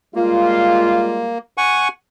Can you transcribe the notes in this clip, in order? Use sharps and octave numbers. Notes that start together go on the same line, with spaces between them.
G3 G#3 A#3 F4
F#5 G#5 C#6